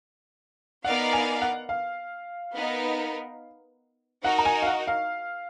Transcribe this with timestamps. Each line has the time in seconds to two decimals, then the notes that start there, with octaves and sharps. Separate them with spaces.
0.84 B3 D#4 A#4 D5 F5 F#5
1.13 G#5
1.42 F#5
1.69 F5
2.55 B3 D#4 A#4
4.24 D#4 F#4 A#4 F#5
4.38 A#5
4.45 G#5
4.62 F5
4.67 F#5
4.87 F5